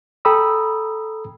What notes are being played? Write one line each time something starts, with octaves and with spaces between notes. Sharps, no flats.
A4 G5 A#5 B5 D#6 E6